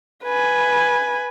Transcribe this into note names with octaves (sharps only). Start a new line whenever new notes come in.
B4 G#5